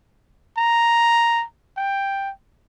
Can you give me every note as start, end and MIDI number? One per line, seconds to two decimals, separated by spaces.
0.57 1.44 82
1.77 2.31 79